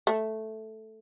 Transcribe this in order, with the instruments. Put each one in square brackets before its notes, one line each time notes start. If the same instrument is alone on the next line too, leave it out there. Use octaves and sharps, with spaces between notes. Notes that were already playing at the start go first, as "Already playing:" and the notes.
[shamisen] A3